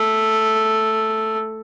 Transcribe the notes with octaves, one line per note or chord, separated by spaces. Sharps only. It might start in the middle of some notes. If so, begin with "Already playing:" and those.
Already playing: A3